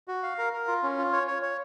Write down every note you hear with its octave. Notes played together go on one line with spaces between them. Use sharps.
F#4
F5
A#4
A#4
F4
C#4
F4
C#5
C#5
C#5